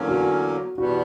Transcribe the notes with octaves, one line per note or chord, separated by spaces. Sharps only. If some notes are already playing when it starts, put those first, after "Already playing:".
Already playing: E2 D3 F#3 A#3 C#4
F#4
E2 B2 G3 B3 F#4